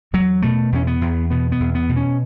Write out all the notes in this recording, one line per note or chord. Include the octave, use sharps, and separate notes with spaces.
E2 F#3
B2 A3
E2 C#4
B3
E2
B2 B3
B3
E2
B3
B2
C#4